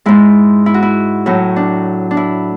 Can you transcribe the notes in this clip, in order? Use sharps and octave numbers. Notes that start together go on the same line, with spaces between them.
G#2 G#3 E4
E4
F#4
E4
A2 F#3 A3
D4
D4
E4